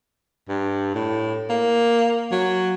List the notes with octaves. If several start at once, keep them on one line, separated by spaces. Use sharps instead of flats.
G2
A2
A#3
F#3